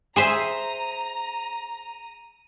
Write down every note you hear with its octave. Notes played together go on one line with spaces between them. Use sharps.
G#4 C5 E5 A#5 D#7